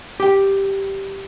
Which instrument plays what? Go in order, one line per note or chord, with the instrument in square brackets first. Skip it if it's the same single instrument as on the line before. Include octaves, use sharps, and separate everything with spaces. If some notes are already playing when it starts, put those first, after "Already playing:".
[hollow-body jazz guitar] G4 G5